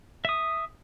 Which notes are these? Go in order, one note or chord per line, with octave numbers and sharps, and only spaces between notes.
E5 D#6